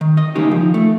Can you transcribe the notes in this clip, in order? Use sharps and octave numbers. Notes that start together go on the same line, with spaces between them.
D#3
D#5
C#3 E3 G3 A#3 D#4 G4
F3
A3